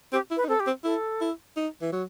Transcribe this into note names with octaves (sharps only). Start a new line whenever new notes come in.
C4 G4
E4
B4
D#4
C4 A4
G4
C4
E4 A4
E4
D#4
E3
F#3